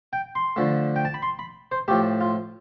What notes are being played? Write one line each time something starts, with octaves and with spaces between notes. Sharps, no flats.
G5
C6
D3 F3 A3
G5
A5
B5
C6
B5
C5
A2 F3 A3 G4
F4